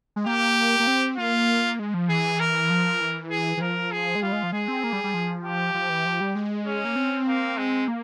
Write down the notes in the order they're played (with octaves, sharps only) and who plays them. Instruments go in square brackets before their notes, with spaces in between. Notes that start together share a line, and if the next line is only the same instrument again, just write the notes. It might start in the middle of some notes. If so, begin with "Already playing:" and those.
[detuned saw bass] G#3
[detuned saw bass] A#3 [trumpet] G4
[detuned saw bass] A#3
C4
[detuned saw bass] A#3 [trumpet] F4
[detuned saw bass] G#3
F3
[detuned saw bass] E3 [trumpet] G#4
[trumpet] A#4
[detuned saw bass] F3
E3
[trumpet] G#4
[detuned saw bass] E3
[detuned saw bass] F3 [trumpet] A#4
[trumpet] G#4
[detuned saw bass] G#3
[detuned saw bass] G3 [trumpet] F4
[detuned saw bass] G#3
F3
[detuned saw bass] G#3 [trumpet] G#4
[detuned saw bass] C4
A#3
G3
G3
F3
[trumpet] G4
[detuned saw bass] F3
E3
F3
G3
G#3
[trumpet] C#4
[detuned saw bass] A#3
C4
[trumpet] A#3
G#3
[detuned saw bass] A#3